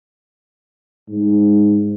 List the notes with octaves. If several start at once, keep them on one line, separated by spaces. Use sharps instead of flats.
G#2